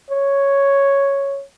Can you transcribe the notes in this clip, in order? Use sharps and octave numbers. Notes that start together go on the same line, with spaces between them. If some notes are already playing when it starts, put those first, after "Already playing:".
C#5